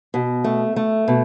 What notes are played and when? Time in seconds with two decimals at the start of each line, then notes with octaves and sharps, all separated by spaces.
0.14 B2
0.44 A3
0.76 A3
1.08 B2